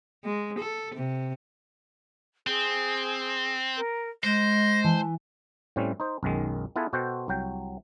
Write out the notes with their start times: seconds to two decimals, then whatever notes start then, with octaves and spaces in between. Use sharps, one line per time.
0.25 G#3
0.59 A4
0.95 C3
2.47 C4 G#4
3.77 A#4
4.24 G#3 C5 A#6
4.84 E3 A5
5.76 A2 G3 C4 C#4
6.00 D#4 C5
6.23 B1 F#2 D#3 G#3
6.76 B3 E4 F4 G#4 A4 B4
6.93 B2 F#4 A4 C5 F#5 G5
7.28 C2 F#3 G5